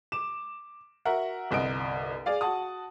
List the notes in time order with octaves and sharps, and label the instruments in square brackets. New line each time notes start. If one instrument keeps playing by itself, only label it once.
[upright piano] D6 E7
F#4 A#4 E5 F#5
G1 C2 D#5 D#6 D7
G#4 D5 F5
F#4 F#5 A5 D#6